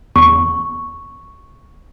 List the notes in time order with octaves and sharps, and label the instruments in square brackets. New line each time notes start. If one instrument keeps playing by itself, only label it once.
[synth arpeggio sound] E2 [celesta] C#6